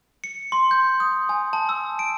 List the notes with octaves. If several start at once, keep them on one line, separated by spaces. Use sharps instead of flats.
C#7
C6
G6
D#6
G#5
A5
E6
D7